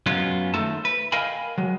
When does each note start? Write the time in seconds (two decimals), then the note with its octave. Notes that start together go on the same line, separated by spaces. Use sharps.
0.06 F#2 F#3 G#3 B3 C#4 F4
0.54 D#3 A3 D#4 F4 A4 A5
0.85 B4
1.12 A#4 D#5 F5 G5 G#5 B5
1.58 F#3 G#3